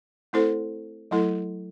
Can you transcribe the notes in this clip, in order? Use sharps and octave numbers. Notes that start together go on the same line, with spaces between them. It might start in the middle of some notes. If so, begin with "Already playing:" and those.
A3 C4 E4 A4 C5
F#3 A3 E4 A4